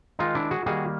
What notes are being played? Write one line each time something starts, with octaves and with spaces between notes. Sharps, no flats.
D#3 G#3 D#4 F4
D4 E4
F#4 G#4
D#3 G3 A#3 F#4 G#4